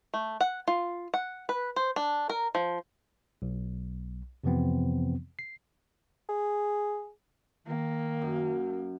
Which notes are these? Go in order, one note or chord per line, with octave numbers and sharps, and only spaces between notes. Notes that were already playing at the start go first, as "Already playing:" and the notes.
A3
F#5
F4
F#5
B4
C5
D4
A#4
F3
B1
F2 C3 E3 F3 B3 C4
C7
G#4
D#3 A#3
F#2